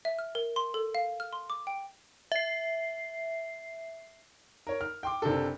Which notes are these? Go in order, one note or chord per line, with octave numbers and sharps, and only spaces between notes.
E5
F6
A#4
C6
A4
F5
F6
C6
D6
G5
E5 C7
A#4 C#5
F6
G5 C6 D6
F#1 C3 D4 A4